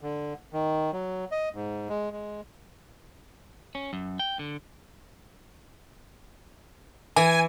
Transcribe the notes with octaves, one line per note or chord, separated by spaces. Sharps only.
D3
D#3
F#3
D#5
G#2
G#3
G#3
C#4
F#2
G5
D3
E3 G#5